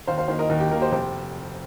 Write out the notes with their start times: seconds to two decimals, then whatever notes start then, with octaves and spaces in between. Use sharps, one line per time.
0.07 D#2 C5 F5
0.18 C5 F5
0.28 D#3 A#3 C5 F5
0.39 A#4 D#5
0.50 D#2 A#4
0.60 G4
0.71 D#3 A#3 A#4
0.81 G4 C5
0.92 F1 G4 C5